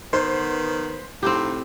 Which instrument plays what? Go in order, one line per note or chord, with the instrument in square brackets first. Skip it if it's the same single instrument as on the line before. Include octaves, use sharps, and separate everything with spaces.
[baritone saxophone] D#3 [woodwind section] B3 B4 [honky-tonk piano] C5
[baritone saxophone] A2 [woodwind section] F3 D#4 [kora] C4 G4